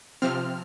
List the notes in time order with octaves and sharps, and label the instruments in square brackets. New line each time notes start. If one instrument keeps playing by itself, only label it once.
[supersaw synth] C3 F3 C4 F6